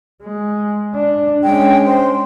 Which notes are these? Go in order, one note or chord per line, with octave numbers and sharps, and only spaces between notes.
G#3
D4
G#3 C#4 G5
C5